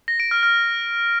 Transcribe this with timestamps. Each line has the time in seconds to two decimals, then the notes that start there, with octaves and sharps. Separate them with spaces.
0.08 A#6
0.20 D7
0.31 F6
0.43 F6